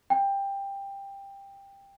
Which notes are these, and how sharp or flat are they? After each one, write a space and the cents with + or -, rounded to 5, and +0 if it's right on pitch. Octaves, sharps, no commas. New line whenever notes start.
G5 +15